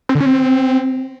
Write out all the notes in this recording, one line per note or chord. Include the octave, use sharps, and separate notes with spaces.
C4
D3
C#4
C4